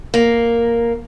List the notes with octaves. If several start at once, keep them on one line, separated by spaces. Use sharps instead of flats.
A#3